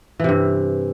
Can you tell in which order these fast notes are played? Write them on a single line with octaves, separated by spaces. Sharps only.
E3 C3 G2